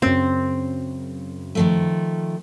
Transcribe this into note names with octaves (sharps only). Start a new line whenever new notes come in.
F#2 C#3 C4
D#3 F3 A3